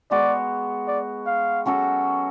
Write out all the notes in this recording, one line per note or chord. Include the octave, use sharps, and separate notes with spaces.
G#3 B3 F#4 D5
D5
F5
F#3 C#4 F#4 A4